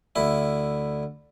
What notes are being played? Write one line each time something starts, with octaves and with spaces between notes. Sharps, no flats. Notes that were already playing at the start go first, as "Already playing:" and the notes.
D2 E4